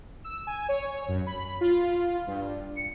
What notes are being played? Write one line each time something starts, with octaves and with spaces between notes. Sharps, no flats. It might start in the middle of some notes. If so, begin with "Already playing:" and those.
E6
G#5
C#5
F#2
B5
F4
G2
C#7